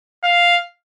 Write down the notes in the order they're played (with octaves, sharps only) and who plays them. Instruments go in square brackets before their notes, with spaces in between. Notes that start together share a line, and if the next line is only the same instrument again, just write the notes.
[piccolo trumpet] F5